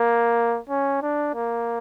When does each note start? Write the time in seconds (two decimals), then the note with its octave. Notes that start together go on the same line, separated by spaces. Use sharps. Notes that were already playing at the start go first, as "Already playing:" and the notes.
Already playing: A#3
0.69 C#4
1.02 D4
1.34 A#3